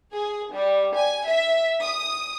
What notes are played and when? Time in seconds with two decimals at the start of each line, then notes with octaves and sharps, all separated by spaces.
0.12 G#4
0.53 G3
0.95 G#5
1.26 E5
1.82 D#6